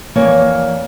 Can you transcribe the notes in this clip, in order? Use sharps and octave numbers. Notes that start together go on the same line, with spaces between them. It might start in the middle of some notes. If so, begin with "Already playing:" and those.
F2 E3 A#3 C#5 D5